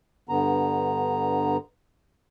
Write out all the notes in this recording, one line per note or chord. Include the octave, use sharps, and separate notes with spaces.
G2 D3 B3 A#5